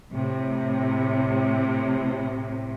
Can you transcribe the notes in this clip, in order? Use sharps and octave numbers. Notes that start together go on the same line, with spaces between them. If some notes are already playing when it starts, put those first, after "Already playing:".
A2 C3